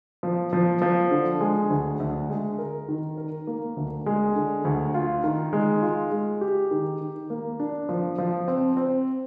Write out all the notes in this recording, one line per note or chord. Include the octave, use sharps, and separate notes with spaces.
F3
F3
F3
D3
G#3
D2
D2
G#3
A#4
D#3
A#4
A#3
D2
G#3
D3
D2
F4
D#3
G#3
F4
G#3
G4
D#3
D#3
A#3
D4
F3
F3
C4
C4